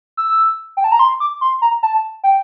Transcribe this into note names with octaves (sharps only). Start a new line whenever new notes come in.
E6
G5
A5
A#5
C6
D6
C6
A#5
A5
G5